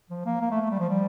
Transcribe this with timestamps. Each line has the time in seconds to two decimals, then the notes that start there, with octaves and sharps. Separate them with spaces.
0.10 F3
0.26 A#3
0.41 A#3
0.51 A3
0.61 A3
0.70 G3
0.79 F3
0.89 G3